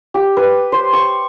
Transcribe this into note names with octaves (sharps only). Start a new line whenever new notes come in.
G4
B4
C5
C#6